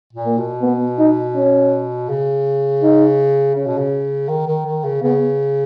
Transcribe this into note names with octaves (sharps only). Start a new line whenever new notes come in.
A#2
A#3
B2
B3
D#4
C#4
C#3
D#4
C#3 C#4
B2
C#3
D#3
D#3
D#3
C#3
C#3 B3